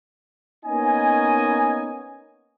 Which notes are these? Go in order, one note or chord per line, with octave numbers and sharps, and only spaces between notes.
A#3 B3 C#4 D#4 D#5 G#5